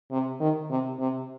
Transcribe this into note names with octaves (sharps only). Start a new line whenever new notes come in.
C3
D#3
C3
C3